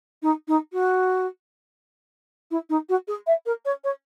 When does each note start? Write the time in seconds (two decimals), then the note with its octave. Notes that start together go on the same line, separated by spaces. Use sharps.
0.22 D#4
0.48 D#4
0.73 F#4
2.51 E4
2.70 D#4
2.89 F#4
3.08 G#4
3.27 E5
3.46 A#4
3.65 C#5
3.84 C#5